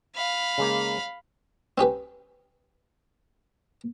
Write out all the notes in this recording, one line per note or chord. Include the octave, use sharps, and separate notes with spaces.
F5 B5
C#3 G#3 A#3
C4 C#4 G4 B4